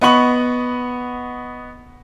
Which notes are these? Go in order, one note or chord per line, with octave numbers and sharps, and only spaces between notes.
B3 D#5 F#5 B5 C#6 F#7